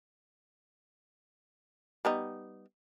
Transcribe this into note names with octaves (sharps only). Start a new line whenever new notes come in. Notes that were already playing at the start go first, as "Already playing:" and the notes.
G3 B3 D#4